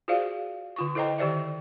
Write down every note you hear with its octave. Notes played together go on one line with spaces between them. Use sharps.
F4 F#4 G#4 C5 D5 F5
D3 F4 C#6
E4 A4 C5 D#5 G5 A#5
D#3 G4 C5 D5 E5